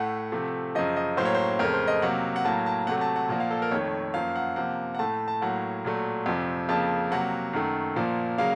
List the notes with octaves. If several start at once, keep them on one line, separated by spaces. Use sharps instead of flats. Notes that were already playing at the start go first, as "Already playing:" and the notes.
Already playing: A2 A3 F#5
C3 F3 A3
F#2 C#3 F3 D#5
D#5
A2 F#3 A#3 C5
C#5
C5
F2 C#3 A3 A#4
C5
D#5
C3 F#3 A#3 F#5
F#5
A2 F#3 A#3 A5
A5
C3 F#3 A3 F#5
F#5
A5
F#5
A#2 F3 A#3 F#5
F5
A4
A#4
F2 D#3 A3 C#5
F#2 F3 A#3 F5
F#5
C3 F3 A#3 F#5
F#5
A2 A3 A5
A5
A2 F#3 A#3 F#5
A#2 F#3 A3
F2 C3 F3
F2 C#3 F3 A#3 A5
C3 F#3 A#3 F#5
F#2 D#3 A3
A#2 F3 A#3
C#3 F#3 A#3 F5